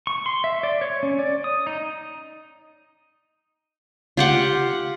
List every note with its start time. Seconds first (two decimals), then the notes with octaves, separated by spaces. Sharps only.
0.07 C#6
0.26 C6
0.44 E5
0.63 D5
0.81 C#5
1.03 C#4
1.19 D5
1.44 D#6
1.67 D#4
4.17 F4 G4 F#5